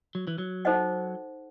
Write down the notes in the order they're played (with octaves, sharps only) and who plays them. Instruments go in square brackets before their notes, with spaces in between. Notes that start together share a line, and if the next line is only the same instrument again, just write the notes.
[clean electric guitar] F#3
E3
F#3
[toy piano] D#4 A4 C5 D#5 F#5